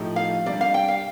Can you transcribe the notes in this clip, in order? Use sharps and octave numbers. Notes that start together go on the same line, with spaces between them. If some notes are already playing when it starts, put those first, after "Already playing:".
Already playing: A2 F3 A3 D#4 G4
F5
C3 G3 D4 D5
F5
G5
F5